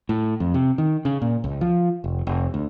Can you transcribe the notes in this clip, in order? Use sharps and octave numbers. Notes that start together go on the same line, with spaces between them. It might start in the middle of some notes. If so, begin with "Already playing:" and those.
A2
F2
C3
D#3
C#3
A#2
C#2
F3
F1
F1
D2